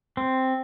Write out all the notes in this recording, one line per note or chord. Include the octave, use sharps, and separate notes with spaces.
C4